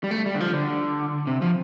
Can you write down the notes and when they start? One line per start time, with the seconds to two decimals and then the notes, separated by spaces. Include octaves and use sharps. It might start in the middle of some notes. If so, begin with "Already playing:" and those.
0.04 G3
0.11 A3
0.26 G3
0.35 D3
0.40 F3
0.54 D3
1.27 C3
1.42 F3